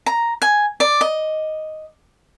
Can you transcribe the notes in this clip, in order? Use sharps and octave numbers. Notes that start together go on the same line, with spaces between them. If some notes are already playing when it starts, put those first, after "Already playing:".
A#5
G#5
D5
D#5